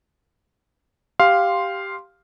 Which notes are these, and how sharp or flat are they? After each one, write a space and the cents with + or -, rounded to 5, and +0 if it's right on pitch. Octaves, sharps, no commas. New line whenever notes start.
G4 +0 F5 +0 C6 +0